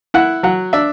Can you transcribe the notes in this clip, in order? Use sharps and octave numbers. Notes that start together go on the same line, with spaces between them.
E4 F#5
F#3 F#5
D4 E5